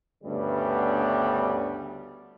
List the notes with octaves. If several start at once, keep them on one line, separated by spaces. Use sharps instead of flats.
D2 G2 C#3 G3 B3